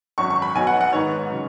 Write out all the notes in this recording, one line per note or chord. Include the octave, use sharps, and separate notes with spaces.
G#1 F#2 F#3 C#6
C#6
B5
B1 B2 F#3 G#5
F#5
F#5
G#2 D#3 B3 D#4 C#5
C#3 F#3